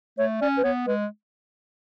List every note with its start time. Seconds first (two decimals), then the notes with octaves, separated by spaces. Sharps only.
0.18 A3 C#5
0.41 C#4 D5
0.57 B4
0.64 B3 C#5
0.86 G#3 B4